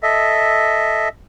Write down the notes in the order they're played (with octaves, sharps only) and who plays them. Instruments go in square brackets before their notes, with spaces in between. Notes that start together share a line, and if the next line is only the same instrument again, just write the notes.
[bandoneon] A4 D#5 E5